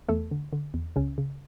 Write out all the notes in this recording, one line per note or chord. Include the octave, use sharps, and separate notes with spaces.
E2 A3 A4
D3
D3
E2
C#2 C#3 C#4
C#3